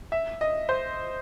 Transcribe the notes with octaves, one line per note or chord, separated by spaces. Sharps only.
E5
D#5
C5